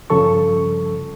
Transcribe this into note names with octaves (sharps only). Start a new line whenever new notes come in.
G2 C#3 F3 A4 C#6